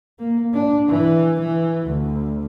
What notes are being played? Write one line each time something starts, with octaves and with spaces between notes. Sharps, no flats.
A#3
D4
E3
E3
D2